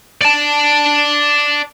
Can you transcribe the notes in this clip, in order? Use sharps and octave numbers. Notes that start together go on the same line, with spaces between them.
D5 A5